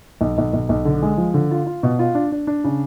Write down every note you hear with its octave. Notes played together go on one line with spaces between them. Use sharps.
B1
B1
B1
B1
D3
G#3
F3
D3
F4
F4
B2
F4
D4
D4
D4
C#3